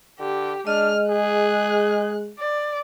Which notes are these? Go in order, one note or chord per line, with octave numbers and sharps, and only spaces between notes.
D3 G4
G#3 D4 D#5 F6
G#4 F#6
D5